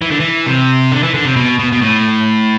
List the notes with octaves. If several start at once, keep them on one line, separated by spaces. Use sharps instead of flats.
E3
D3
E3
C3
D3
E3
D3
C3
B2
B2
B2
A2